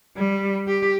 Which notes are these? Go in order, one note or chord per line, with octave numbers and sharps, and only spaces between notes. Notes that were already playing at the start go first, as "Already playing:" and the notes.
G3
G4